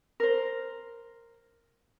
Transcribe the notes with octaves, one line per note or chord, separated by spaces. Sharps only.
A#4 C5